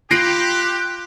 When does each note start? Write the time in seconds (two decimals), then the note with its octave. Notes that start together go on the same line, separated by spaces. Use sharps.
0.11 F4 G4 B5 F#6 A#6 C7 D7